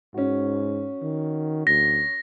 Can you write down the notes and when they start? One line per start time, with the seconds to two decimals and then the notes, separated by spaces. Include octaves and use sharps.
0.14 G#2 C#4 F#4
1.02 D#3
1.67 D2 A#6